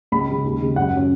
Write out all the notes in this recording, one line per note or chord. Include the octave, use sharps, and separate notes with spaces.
C#2 B5
C#3 G#3 C#4
D#2
C#3 G#3
F#2 F#5
F#3 C#4